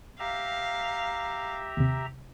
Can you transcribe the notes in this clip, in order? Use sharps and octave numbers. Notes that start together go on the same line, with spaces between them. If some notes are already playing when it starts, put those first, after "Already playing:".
G4 E5 F5 A#5
D#2 C3